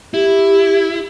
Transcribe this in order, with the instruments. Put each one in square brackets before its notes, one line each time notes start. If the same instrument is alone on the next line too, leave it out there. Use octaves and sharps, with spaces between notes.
[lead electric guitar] E4 [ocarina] G4